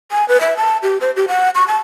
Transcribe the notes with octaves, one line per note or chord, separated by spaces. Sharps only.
G#5
B4
E5
A5
G4
C5
G4
F#5
C#6
A5